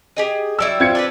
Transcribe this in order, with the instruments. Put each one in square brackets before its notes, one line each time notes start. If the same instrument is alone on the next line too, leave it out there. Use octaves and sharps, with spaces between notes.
[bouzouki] G4 G#4 D#5
[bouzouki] F#3 G3 E4 [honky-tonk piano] E6
[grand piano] C4 G#6 C#7 [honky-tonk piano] F4
[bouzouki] D4 G#4 B4